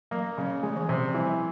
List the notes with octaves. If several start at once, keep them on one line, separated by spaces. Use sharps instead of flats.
F#3 A#3
C#3 F#3
F3 G#3
E3
C3 F3
F3
E3 G3